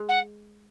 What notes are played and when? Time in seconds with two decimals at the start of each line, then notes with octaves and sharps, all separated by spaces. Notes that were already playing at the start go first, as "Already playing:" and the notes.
Already playing: G#3
0.09 F#5